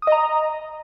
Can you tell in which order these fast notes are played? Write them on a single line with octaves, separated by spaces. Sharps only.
D#6 D#5 A#5